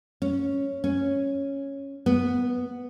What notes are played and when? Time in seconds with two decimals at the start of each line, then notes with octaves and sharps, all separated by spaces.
0.22 C#4
0.84 C#4
2.06 B3